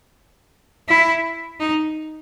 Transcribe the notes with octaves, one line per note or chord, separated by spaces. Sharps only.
E4
D#4